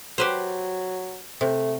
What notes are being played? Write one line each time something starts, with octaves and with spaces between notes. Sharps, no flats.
F#3 G4 B4 C5
C3 A3